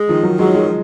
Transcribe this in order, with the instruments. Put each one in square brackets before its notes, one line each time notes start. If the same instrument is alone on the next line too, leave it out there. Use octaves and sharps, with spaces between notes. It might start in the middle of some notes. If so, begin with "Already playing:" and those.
Already playing: [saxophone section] G#3
[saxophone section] D#3 [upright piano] F3
[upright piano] F#3
[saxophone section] F#3 [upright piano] G#3
[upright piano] G#3